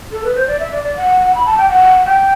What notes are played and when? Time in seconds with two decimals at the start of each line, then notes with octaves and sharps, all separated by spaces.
0.12 A4
0.24 B4
0.36 C5
0.48 D5
0.60 E5
0.72 D5
0.84 D5
0.96 F#5
1.35 B5
1.46 A5
1.57 G5
1.69 F#5
2.05 G5